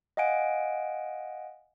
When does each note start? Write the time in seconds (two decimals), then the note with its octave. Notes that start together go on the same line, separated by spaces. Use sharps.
0.17 D#5 F5 F#5 G#5 D7